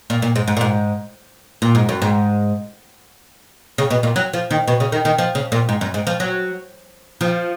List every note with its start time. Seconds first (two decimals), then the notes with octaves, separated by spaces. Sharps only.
0.10 A#2
0.22 A#2
0.36 G#2
0.48 G#2
0.57 A#2
0.61 G#2
1.62 A#2
1.75 G#2
1.89 F#2
2.02 G#2
3.78 C#3
3.90 B2
4.03 A#2
4.16 F#3
4.33 F3
4.51 D#3
4.68 B2
4.80 C#3
4.92 D#3
5.05 D#3
5.18 F3
5.35 C#3
5.52 A#2
5.69 G#2
5.81 F#2
5.94 G#2
6.07 F3
6.20 F#3
7.21 F3